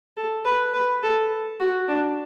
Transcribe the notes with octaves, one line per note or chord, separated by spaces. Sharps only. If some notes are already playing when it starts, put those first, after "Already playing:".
A4
B4
B4
A4
F#4
D4